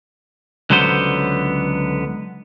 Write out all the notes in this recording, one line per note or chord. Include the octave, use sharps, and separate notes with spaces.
C#2 D3 F#3 B3 C5